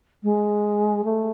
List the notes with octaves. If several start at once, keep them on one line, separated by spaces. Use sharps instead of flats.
G#3
A3